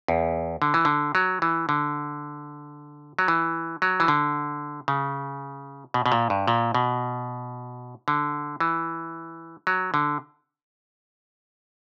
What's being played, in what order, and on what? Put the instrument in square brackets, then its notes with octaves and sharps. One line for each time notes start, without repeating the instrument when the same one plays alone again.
[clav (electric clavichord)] E2
D3
E3
D3
F#3
E3
D3
F#3
E3
F#3
E3
D3
C#3
B2
B2
A#2
G2
A#2
B2
D3
E3
F#3
D3